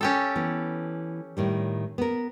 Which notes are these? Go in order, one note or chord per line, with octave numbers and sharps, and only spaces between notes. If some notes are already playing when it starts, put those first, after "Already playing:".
C#4 G4 A4
E3 B3
A2 D#3 G3
B3 A#4